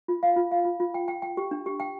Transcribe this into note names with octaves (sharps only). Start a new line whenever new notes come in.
F4
F5
F4
F5
F4
F4
G5
G5
G5
G4
D4
G4
G5